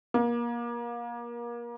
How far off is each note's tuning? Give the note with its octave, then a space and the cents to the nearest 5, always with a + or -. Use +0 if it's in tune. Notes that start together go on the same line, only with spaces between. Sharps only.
A#3 +30